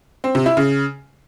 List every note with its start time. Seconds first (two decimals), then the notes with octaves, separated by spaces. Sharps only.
0.24 C4
0.35 C3
0.46 E4
0.57 C#3